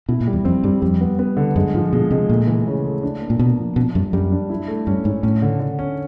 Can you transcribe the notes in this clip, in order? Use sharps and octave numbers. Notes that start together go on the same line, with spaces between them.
B2 E4
A#2
G3
E2
F2 C4
G2 G3
F2 G3
B3
B3
D3
F#2 G#3
G#2 F3
B2 G#3
C3 G#3
A#2 A3
E3
C#3
A3
D4
A#3
A#2
B2 A#3
F3
B2 D4
F#2 G3
F#2 G3
D4
E4
A3
G2 C#4
G#2 C#4
A2 C#4
D3
D3
C#4